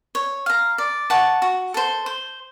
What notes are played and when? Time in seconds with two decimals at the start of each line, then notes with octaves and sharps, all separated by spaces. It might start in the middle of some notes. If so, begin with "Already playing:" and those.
0.15 C#5
0.46 F5 A#5
0.78 D5
1.10 F#5 A5 C#6
1.42 F#4
1.74 A4 C5
2.06 C5